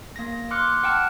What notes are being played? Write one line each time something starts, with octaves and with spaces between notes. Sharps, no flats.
A#3 A#6
C6 D6 F6 F#6 C#7
F#5 G5 A5 F6 F#6